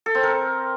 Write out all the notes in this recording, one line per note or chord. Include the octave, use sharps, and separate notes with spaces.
A4
C4
A#4